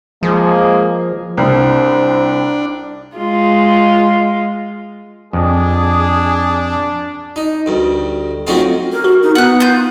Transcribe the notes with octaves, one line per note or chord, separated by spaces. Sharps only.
F3 G#3 A#3 G#4
C2 C4 D4
G#3 F4
F2 D4 G#4
D#4
D2 G2
F#3 A3 C4 C#4 D#4 F4
A#4
F#4
D#4
B3 F#5 F#6
F4 G6